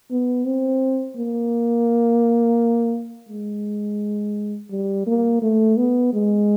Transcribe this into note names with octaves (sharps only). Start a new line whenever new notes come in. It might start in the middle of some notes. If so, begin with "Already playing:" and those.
B3
C4
A#3
G#3
G3
A#3
A3
B3
G#3